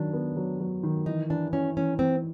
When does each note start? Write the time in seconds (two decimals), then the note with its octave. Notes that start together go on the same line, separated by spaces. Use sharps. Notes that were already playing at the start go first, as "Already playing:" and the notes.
Already playing: D#3 F#3 D4
0.13 B3
0.36 F#3
0.60 F#3
0.83 D#3
1.06 E3 D#4
1.30 E3 D4
1.53 C#4 E4
1.77 E3 C#4
1.99 E3 C4